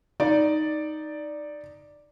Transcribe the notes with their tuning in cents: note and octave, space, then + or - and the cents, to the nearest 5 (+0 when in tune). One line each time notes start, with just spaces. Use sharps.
D#4 +0 D5 +0